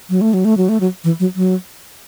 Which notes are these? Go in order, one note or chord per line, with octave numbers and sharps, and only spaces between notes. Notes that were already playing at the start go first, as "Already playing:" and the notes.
F#3
A3
F#3
A3
F#3
A3
F#3
E3
F#3
F#3